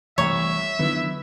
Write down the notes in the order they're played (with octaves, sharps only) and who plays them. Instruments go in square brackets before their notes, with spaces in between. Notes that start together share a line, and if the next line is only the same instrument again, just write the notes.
[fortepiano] C2 A#5 [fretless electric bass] E3 A3 [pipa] C#5 [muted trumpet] E5
[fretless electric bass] D3 D#3 F#3 [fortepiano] B3 E4